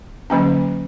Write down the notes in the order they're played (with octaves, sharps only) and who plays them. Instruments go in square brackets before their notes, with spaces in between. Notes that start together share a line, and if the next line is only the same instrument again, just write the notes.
[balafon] D3 F#3 A#3 C#4